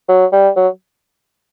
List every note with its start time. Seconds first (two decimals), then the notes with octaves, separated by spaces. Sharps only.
0.09 F#3
0.32 G3
0.56 F#3